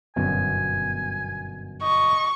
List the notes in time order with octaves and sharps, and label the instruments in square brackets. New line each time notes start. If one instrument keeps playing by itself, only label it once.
[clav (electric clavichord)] G1 F#2 B2 [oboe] G#5
[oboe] D#5 [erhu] C#6